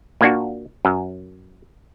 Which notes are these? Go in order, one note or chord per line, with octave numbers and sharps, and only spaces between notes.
A#2 A#3 D4 F#4
F#2